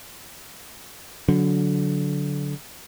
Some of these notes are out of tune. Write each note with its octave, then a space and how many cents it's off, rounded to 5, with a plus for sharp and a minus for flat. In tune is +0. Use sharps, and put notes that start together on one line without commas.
D3 -25 F#3 -10